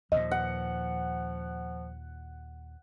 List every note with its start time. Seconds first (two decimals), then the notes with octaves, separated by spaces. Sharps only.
0.12 D#2 A#2 F3 D#5
0.31 F#5